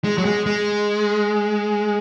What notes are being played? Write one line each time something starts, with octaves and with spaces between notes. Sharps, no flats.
G#3
F#3
G#3
G#3